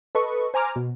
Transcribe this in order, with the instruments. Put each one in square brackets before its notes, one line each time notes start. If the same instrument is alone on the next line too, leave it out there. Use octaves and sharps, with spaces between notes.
[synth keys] A4 B4 D#5 C#6
C5 G#5 A#5 D6 F6
B2